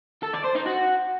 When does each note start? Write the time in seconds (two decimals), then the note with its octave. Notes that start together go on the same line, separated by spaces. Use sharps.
0.23 A4
0.34 D5
0.44 C5
0.55 D#4
0.66 F#4